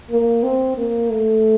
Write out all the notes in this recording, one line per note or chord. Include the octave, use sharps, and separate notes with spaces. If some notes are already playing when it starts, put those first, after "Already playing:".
A#3
C4
A#3
A3